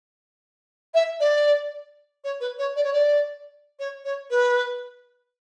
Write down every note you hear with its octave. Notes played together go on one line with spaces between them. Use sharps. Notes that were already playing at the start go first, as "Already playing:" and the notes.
E5
D5
C#5
B4
C#5
D5
C#5
D5
C#5
C#5
B4